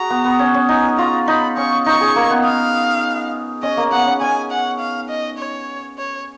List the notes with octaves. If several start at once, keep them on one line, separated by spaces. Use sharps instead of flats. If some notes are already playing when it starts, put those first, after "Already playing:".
Already playing: F#4 G#4 A#5
B3
B3
C#4
C#4
D#4 G#5
F4 A#5
D#4 B5
C#4 C#6
D#4 C#6
G#4
A#3
B3
F5
C#4 D#5
A#3
B3 F#5
C#4
C#4 G#5
F#5
F5
D#5
C#5
C#5